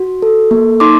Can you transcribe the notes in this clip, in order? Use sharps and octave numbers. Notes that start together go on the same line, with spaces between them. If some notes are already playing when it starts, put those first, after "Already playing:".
Already playing: F#4
A4
A#3
D#4 C6 D6